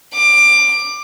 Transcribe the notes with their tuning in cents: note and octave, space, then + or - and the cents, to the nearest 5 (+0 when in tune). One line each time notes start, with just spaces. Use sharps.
D6 +20